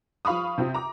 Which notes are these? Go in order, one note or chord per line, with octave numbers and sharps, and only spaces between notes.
F3 F5 B5 C#6 D#6
C3 C4 F4
A#5 D6